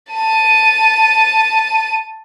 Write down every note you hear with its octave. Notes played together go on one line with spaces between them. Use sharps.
A5 D#7